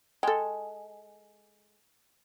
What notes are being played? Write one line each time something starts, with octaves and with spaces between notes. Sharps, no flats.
G#3 A4 G5